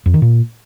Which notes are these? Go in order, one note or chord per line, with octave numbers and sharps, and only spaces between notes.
F2
D#3
A#2